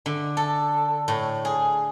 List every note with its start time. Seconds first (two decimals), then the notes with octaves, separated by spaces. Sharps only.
0.06 D3
0.37 A4
1.08 A2
1.45 G#4